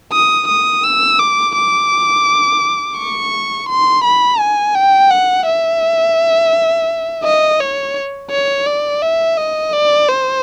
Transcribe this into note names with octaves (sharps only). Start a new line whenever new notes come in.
D#6
D#6
E6
D6
D6
C#6
C6
B5
G#5
G5
F#5
E5
D#5
C#5
C#5
D5
E5
D#5
D5
C5